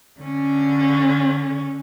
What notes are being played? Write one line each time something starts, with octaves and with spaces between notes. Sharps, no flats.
D3 C#4